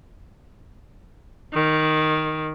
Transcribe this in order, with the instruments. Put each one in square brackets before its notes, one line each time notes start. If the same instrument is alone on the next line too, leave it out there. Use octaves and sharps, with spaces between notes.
[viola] D#3